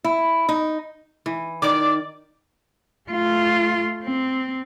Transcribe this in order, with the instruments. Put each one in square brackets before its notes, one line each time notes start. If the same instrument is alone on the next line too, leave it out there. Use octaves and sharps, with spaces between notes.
[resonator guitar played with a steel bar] E4
D#4
[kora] E3
[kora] D#3 [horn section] D5 [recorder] D6
[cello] A3 F4
C4